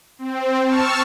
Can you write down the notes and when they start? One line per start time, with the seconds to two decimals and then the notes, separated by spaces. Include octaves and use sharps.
0.19 C4
0.64 A5 C#6 E6 F6